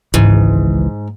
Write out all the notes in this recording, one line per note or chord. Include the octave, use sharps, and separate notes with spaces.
G#1 C#2 G#2 E3